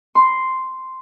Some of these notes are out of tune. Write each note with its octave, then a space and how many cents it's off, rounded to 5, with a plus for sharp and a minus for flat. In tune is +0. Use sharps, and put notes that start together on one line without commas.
C6 -5